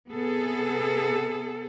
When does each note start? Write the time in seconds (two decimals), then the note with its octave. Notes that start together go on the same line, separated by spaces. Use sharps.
0.10 C3 B3 G#4 A4